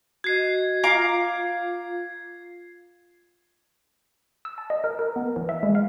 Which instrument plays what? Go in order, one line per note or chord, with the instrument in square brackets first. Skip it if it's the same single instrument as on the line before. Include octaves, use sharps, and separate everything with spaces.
[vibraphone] F#4 D#5 [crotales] G#6 C7
[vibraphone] F4 [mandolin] F5 A#5 D6
[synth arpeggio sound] E6
A5
D#5
A#4
A#4
B3
E3
E5
G#3
F5